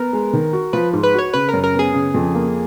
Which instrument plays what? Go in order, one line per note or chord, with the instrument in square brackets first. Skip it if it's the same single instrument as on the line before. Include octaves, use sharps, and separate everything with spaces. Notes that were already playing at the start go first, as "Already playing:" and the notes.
Already playing: [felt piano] B3 [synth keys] A#4
[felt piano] G#3
D#3
F#4
[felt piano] F3 [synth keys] B4
[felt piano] G#2
[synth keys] B4
[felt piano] F#4 [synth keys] C#5
[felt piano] C#3 [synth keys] B4
[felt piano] F#2 [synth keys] A#4
[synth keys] A#4
[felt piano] B3 [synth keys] G#4
[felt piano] C#3
F2
A#3